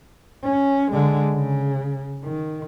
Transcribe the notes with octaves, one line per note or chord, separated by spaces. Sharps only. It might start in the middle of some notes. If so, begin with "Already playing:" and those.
C#4
D3 G#3
C#3
D#3